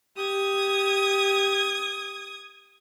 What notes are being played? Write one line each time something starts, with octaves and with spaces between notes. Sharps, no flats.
G4 D#6 G#6